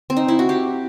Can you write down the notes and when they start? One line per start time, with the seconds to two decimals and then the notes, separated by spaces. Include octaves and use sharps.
0.10 C4
0.17 D#4
0.28 E4
0.39 F#4
0.49 G4